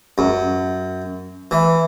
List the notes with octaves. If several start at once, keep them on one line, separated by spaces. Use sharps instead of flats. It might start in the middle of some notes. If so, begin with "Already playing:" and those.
F#2
E3